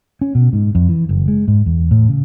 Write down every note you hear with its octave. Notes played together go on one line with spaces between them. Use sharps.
C#4
B2
G#2
F2
E3
F#1
G#3
G#2
E2
A2
C#3